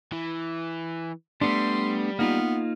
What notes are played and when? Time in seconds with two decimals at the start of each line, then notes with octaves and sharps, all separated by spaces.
0.12 E3
1.41 G3 A3 B3 D4 C6
2.19 A#3 B3 D#4 F4